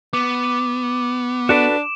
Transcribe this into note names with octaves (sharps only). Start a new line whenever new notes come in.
B3 D6
D4 F#4 A4 B4 D7 E7